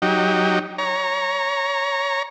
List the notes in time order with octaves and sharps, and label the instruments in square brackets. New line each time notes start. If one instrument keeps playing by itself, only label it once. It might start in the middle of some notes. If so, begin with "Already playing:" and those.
[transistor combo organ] F#3 D#4 G4
C#5 A#5